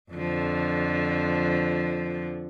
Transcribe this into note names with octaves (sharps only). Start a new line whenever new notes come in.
F2 D3 F3